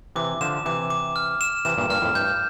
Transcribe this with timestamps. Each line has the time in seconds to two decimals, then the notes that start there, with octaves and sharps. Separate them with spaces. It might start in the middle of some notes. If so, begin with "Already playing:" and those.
0.16 C3 E3 D6
0.41 D3 F3 E7
0.66 C3 E3 D6
0.90 D6
1.16 F6
1.41 E7
1.65 C3 E3 E7
1.78 G2 A#2
1.90 G2 A#2 F6
2.02 F2 A2
2.14 G2 G6